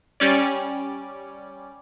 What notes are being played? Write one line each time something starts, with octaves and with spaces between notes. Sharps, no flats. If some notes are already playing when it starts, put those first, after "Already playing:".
G3 C#4 D5